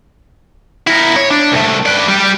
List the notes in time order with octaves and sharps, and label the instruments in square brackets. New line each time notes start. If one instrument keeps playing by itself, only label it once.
[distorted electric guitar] E4 A#4
C#5
D4
C2 A3
B4 D5
G3 G4